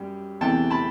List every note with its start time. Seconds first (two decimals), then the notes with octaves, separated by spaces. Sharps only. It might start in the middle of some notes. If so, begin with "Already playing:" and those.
Already playing: F#2 G3
0.41 E2 C3 E3 A3 G5 A5
0.70 A5 B5